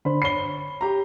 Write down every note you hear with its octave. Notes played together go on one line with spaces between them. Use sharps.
D3 D4 C5 B5
C#5 B5 C7 G7
G4 A#5